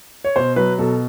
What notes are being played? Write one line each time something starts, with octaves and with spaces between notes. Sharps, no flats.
C#5
B2 C5
F#3 B4
B2 A4